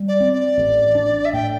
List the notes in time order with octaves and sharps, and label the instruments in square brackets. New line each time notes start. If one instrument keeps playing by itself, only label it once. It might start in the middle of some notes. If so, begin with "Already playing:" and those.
Already playing: [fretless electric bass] G3
[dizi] D5
[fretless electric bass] C4
[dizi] D5
[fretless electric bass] A1
D4
[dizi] E5
[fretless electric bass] A2 [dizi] G5